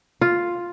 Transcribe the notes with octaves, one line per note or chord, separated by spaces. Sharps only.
F4